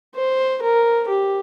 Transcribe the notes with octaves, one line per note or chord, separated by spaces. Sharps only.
C5
A#4
G4